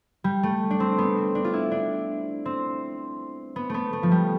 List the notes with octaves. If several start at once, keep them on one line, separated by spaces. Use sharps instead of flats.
G3
A3
D4
C4
B3
C4
D4
F4
E4
D4
C4
B3
A3 B3
A3
F3
G3